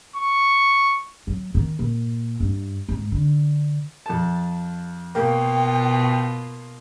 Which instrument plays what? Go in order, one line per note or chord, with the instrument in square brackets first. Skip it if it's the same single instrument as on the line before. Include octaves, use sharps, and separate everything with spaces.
[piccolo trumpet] C#6
[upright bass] F#3
D#3
A#2
G2
G#2
D3
[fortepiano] F2 A5
[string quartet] B2 F4 [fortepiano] A#3 [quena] G5